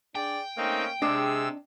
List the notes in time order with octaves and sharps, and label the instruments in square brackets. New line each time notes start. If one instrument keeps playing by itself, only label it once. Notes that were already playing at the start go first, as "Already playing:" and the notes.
[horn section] D4 G#4 D5 [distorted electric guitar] G5
[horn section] A3 A#3 C#4 [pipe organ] C4 D#4
[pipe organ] C3 E6 [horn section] G#3 G#4 [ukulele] D4 D#5